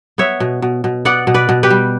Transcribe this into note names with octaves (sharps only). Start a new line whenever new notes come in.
B3 C#5 E5
B2
B2
B2
B3 D5 F#5
B2
B4 D5
B2
G4 B4
G3